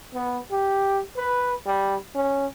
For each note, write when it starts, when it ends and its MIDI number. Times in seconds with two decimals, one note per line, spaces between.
0.15 0.38 59
0.51 1.01 67
1.17 1.52 71
1.66 1.96 55
2.15 2.46 61